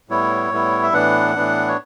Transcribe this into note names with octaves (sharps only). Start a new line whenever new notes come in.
A2 G3 B3 E4 C#5
A2 G3 B3 E4
E5
A2 E3 B3 D4 F#5
A2 E3 B3 D4
C#5